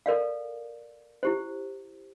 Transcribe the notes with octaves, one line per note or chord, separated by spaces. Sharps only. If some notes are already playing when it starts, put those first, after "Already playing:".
A4 A#4 D5 F5
E4 G4 C5